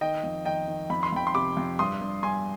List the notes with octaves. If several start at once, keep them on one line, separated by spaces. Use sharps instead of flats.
D#3 D#5 G5
F2
D#3 D#5 G5
D#3
F2 B5
C6
F2 G5 B5
C6
C3 B5 D6
F2
G2 C6 D#6
G2
G2 G#5 C6